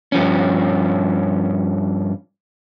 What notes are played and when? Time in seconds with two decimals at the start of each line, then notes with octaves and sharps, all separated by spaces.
0.12 G2 F3 C#4